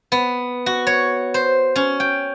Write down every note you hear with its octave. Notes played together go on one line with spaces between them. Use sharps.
B3
F#4
C#5
C5
C#4
G5